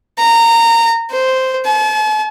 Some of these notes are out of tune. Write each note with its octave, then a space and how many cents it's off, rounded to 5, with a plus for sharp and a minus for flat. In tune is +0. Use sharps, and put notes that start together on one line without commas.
A#5 -20
C5 -5
A5 -45